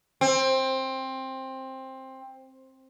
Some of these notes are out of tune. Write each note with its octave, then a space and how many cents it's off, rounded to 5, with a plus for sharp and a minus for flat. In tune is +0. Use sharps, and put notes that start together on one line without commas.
C4 +15